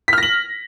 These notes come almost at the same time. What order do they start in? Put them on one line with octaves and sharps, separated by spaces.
B6 F6 A#6 F#7